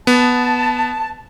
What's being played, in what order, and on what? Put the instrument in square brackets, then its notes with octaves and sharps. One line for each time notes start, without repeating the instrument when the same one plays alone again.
[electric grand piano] B3 [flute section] A5